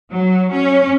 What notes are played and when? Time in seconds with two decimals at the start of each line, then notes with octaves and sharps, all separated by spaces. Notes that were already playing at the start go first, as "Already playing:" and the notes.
0.12 F#3
0.52 C#4